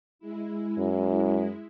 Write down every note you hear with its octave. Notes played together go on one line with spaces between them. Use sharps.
G#3 E4
F#2